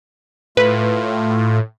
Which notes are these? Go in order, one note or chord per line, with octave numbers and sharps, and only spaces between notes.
A2 A3 F4 B4